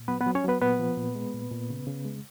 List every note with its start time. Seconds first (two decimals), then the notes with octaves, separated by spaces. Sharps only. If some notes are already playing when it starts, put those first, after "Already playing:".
Already playing: A#2
0.08 F#3 B3 B4
0.21 B3 B4
0.26 F#3
0.35 C#4 C#5
0.44 F#3 B3 B4
0.61 A#2 B3 B4
0.80 F3
0.98 A#2
1.15 G#3
1.34 A#2
1.51 A#2
1.70 C#3
1.87 C#3
2.05 G#3